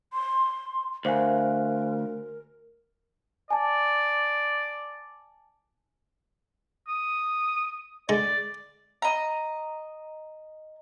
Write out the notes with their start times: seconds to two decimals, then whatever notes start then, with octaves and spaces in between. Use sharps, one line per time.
0.13 C6
1.05 D2 A#4 C5 F5 G#5
3.51 D5 G#5 A5
6.88 D#6
8.09 D3 G#3 D5
9.02 D#5 A#5